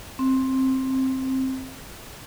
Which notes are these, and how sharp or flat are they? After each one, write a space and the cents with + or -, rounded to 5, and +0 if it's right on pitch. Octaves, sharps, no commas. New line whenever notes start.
C4 +10